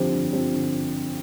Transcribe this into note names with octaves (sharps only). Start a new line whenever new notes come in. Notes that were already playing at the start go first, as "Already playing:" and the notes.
Already playing: D3 F3 C4 G4 C5
D3
F3 C4 G4 C5
D3